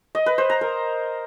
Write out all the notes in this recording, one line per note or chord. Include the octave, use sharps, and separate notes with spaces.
D#5
B4
C5
A#5
A#4